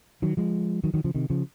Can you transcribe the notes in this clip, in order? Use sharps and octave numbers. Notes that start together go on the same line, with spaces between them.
D#3 F#3
F3 G#3
D#3 F#3
D#3 F#3
C#3 F3
C3 D#3
C#3 F3